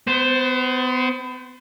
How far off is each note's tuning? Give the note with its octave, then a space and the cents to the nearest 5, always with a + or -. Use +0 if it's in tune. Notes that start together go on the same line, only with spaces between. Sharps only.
B3 +35 C5 +0